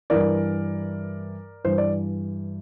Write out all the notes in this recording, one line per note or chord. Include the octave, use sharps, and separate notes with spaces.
G2 E3 A#4 D5
G2 E3 C5
D5